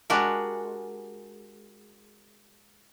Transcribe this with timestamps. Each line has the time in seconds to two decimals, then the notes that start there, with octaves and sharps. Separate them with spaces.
0.10 G#3 D4 F#4 G4 A#4